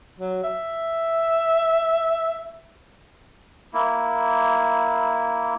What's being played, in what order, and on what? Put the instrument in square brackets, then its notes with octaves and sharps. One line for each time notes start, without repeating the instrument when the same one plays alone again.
[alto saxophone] F#3
E5
[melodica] A#3 E4